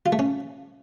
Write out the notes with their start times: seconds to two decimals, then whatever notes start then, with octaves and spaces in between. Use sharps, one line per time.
0.06 F4
0.12 A3
0.19 C#4